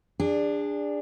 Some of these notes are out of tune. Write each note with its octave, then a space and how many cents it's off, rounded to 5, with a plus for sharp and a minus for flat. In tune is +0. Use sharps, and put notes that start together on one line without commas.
D4 +0 G#4 -30